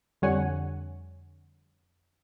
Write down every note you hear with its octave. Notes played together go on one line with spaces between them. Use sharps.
F2 D3 G3 C#5 F#5 G#5